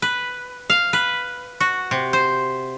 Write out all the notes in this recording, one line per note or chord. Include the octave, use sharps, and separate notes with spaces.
B4
F5
B4
F#4
C3
C5